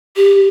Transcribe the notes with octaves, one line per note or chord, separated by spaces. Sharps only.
G4